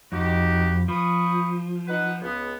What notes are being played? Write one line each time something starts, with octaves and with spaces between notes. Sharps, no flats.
F2 D#4 F#4 G4
F3 B5 C#6 D#6
D#4 B4 F#5
C#2 B3